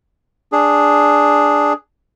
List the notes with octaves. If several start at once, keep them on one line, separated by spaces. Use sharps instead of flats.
D4 G#4